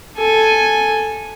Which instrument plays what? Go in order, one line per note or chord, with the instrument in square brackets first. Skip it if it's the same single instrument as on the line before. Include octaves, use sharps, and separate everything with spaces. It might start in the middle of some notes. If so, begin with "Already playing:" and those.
[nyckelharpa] A4 G#5